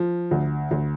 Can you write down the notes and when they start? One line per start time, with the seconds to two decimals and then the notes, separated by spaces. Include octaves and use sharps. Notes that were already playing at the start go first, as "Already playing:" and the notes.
Already playing: F3
0.31 D2
0.71 D2